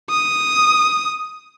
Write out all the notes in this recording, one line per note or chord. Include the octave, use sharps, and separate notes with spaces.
D#6